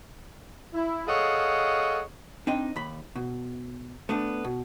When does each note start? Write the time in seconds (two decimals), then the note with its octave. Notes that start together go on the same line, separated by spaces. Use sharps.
0.74 E4
1.07 G#4 A4 C#5 D#5 F5 F#5
2.47 C4 D4 D#4 D#5 G5
2.76 D#2 B5
3.15 B2
4.09 A3 B3 D4
4.44 B2